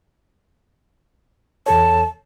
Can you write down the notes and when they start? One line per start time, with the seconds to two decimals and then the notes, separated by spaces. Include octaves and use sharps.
1.66 E2 A4 C#5 A5